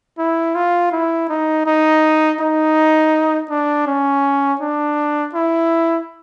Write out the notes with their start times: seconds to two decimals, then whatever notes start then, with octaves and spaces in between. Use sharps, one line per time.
0.18 E4
0.55 F4
0.92 E4
1.29 D#4
1.66 D#4
2.40 D#4
3.50 D4
3.87 C#4
4.61 D4
5.34 E4